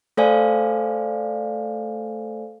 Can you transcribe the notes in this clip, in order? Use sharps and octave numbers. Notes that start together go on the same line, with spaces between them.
A3 A4 C5 D5 F5 G#5